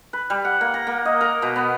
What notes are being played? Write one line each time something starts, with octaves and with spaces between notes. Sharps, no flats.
B4
G3
F#5
A#3
A#5
A#3
D#5
A#4
B2
B3